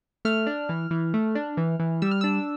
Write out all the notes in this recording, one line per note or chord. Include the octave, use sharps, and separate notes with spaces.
A3 F6
D4
E3
E3
A3
D4
E3
E3
G3 E6
F6
D4 E6